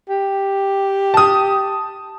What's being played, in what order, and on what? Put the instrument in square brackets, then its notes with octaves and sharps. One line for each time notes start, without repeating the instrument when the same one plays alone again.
[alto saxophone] G4
[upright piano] A5 D#6